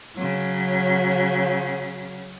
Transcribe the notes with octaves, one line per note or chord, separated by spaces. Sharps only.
C#3 F#3